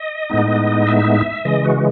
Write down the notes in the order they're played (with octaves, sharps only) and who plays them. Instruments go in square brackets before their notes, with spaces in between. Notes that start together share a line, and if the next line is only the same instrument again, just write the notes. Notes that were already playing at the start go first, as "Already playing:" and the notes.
Already playing: [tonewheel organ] D#5
A2 G#3 B3 D#4
E5
C#3 E3 G#3 D#5
F#4